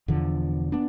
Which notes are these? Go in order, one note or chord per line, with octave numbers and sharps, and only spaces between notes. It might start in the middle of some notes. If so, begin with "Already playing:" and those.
E1 E2 D3 F3
B3 D4